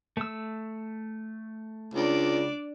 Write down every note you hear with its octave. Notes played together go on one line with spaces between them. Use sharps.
A3 E6
C#2 D4 D5